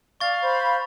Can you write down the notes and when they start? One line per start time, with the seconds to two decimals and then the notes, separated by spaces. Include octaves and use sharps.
0.20 D5 F5 C#6 A6
0.42 C5 B5